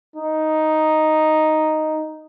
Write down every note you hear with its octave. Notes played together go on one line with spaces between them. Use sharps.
D#4